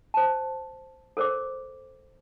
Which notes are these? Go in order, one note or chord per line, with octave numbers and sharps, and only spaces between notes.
C5 A5
A4 A#4 C5 D5 D6